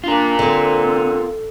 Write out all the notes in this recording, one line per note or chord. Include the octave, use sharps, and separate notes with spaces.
D4 F4 A#4
D3 C4